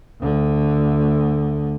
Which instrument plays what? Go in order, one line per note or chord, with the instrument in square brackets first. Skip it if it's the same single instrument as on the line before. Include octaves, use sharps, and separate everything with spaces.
[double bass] D2 D3